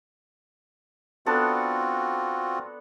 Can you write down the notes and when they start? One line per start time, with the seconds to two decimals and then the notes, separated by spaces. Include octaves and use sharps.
1.26 B3 C4 D4 F4 F#4 A4